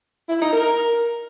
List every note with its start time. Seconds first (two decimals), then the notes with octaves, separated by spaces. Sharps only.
0.29 E4
0.41 D#4
0.53 A#4